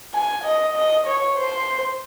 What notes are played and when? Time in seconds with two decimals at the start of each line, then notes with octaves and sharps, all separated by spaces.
0.14 G#5
0.44 D#5
0.76 D#5
1.07 C#5
1.38 C5